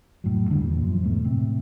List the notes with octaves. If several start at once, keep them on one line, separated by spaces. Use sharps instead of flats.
F1 A2 F#3
D#2 D3 F3 G3
E2 A#2
F#2 F3
E2 G#2 B2 A3
A2 C3